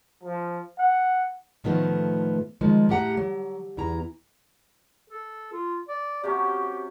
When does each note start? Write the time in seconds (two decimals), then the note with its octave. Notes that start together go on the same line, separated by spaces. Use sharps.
0.24 F3
0.79 F#5
1.64 A2 D#3 F3 A3 B3
2.61 D#3 F3 G#3
2.89 A2 G4 F#5 A#5
3.17 F#3
3.77 E2 E4 A#5
5.10 A4
5.52 F4
5.89 D5
6.24 C3 F#3 C#4 G4